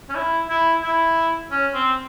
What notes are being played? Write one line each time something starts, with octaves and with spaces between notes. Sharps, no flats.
C#4
E4
E4
E4
C#4
C4